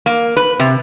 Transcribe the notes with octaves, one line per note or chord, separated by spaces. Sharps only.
A#3
B4
C3